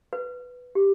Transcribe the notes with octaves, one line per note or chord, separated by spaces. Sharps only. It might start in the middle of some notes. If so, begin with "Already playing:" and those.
B4
G4